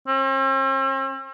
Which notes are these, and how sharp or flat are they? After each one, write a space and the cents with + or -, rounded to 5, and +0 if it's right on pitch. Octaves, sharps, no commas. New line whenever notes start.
C4 +45